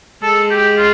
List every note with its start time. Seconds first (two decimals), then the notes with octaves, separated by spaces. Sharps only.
0.22 G#3 A4
0.50 G4
0.78 F4